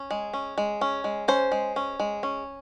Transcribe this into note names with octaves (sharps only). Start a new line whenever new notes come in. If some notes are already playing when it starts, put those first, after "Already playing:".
Already playing: C#4
G#3
C#4
G#3
C#4
G#3
C#4 C5
G#3
C#4
G#3
C#4